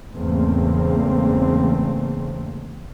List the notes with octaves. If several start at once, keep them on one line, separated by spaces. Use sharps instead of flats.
E2 G#2 C#3 A3 A#3 C4